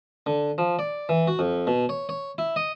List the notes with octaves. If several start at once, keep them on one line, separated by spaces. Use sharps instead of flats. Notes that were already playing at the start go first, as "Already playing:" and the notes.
D3
F3
D5
E3
F#4
F2
B2
C#5
C#5
E4
D#5